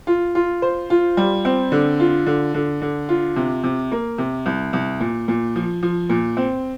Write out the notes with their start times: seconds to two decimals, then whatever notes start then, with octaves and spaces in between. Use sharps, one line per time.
0.07 F4
0.35 F4
0.62 C5
0.90 F4
1.17 G3
1.45 C4
1.72 D3
2.00 F4
2.26 D3
2.54 D3
2.82 D3
3.09 F4
3.36 C3
3.63 C3
3.92 A#3
4.18 C3
4.46 C2
4.73 C2
5.00 A#2
5.28 A#2
5.56 F3
5.83 F3
6.10 A#2
6.37 C4